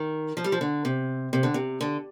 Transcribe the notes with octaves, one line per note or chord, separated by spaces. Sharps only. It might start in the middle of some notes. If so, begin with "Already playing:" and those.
Already playing: D#3
F3
G3
F3
D3
C3
C3
D3
C3
D3